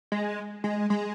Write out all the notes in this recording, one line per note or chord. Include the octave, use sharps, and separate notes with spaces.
G#3
G#3
G#3